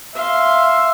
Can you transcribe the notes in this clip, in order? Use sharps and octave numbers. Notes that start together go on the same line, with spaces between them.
E5 F5 C6